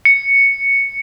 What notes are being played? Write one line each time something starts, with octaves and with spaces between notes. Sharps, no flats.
C#7